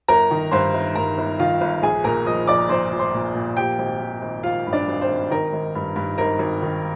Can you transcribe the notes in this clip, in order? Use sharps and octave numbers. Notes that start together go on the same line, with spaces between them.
G1 A#4 A#5
D#3
G2 C5 C6
G1
G2 A#4 A#5
G1
D#3 F4 F5
G1
A#1 G#4 G#5
A#2 A#4 A#5
F3 D#5 D#6
A#1 D5 D6
A#1 C5 C6
F3
C5 C6
A#2
A#2
F3 G4 G5
G#1
G#1
G#1
G#1 F4 F5
G2
D4 D5
G#1
C5
G#1
D#3 A#4
G#1
G2
G2
G#1 A#4
G#1
D#3